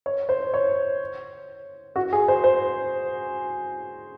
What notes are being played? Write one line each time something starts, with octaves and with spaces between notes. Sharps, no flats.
C#5
C5
C#5
F#4
G#4
C5
C5